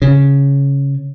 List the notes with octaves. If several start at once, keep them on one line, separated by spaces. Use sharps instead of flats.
C#3